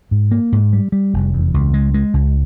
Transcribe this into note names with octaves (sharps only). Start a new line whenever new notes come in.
G#2
A#3
G#2
G3
G3
F1
E2
C#2
G#3
G#3
C#2